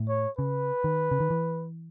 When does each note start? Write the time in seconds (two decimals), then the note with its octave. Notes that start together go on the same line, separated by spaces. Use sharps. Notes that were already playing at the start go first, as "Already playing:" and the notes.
Already playing: A2
0.09 C#5
0.38 C#3 B4
0.84 D#3
1.11 C#3
1.20 D#3
1.30 E3